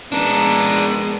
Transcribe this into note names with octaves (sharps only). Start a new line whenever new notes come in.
G#3 B3 D4 A#4